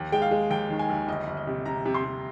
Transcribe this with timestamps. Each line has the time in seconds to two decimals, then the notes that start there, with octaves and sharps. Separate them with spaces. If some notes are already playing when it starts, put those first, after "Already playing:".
Already playing: D#2
0.12 G#3 G5
0.22 F5
0.31 G#3
0.50 D#2 G5
0.70 D#3
0.79 G#5
0.89 D#2
1.07 G1 D#5
1.27 G1
1.37 D#5
1.47 C3
1.66 C3 A#5
1.86 C3
1.94 C6
2.04 C3